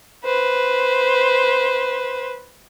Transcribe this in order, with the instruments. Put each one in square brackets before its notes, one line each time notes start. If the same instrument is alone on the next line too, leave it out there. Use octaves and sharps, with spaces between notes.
[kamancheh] B4 C5